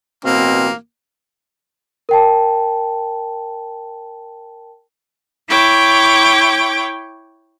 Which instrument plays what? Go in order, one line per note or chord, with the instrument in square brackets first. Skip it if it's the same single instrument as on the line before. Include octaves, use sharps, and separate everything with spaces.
[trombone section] A1 B2 C4 [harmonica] A#3
[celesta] A#4 G5 A5
[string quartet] E4 C#5 G5 D6